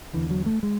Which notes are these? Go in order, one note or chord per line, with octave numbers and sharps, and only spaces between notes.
E2 D3 E3
F#3
A3
G#3